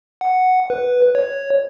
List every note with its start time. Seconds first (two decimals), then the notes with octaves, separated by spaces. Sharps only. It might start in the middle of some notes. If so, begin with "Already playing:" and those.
0.21 F#5
0.70 B4
1.15 C#5